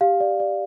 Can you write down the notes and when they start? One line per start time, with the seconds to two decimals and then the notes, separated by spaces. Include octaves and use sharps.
0.01 G4 F5
0.20 D5
0.40 D5